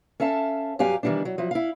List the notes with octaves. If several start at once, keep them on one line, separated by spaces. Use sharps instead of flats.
C#4 A4 E5 F5 A5
G2 F#3 G4 F5 G#5
D#3 E3 G3 B3 D4
F#3
F3 F#3 E4
E4 F5